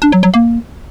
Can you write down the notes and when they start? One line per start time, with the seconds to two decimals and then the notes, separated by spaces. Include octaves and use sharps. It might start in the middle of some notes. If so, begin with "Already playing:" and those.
0.02 D4
0.12 F#3
0.23 F#3
0.34 A#3